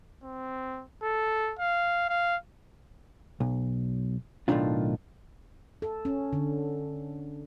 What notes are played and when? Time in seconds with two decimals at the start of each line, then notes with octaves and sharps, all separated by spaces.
0.23 C4
1.02 A4
1.59 F5
2.09 F5
3.40 B1
4.48 B1 F2 A2 D#3 D4 F4
5.82 A4
6.05 C#4
6.33 D3